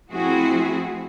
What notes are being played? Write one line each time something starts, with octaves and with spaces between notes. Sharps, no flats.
F3 A3 C4 E4 F#4 G#4